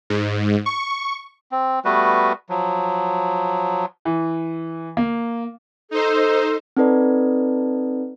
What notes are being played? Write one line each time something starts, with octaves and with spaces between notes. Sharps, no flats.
G#2
C#6
C4
G3 A3 B3 F#4 B4
F3 F#3
E3
A#3
D#4 A4 C5
C4 D#4 A4 B4 D5 A#5